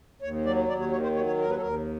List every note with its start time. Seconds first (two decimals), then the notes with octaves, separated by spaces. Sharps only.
0.22 D#2 C#5
0.45 F#3 D5
0.69 D#2 D5
0.80 C#5
0.92 D#3 C#5
1.03 C5
1.14 F#3 C#5
1.27 C#5
1.38 D#2 A#4
1.50 B4
1.56 A4
1.61 D#2 A#4